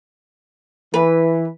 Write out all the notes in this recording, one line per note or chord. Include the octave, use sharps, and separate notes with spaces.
E3 B4